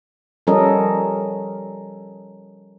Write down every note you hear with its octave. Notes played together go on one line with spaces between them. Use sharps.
F3 G3 C#4 A4 A#4 D#5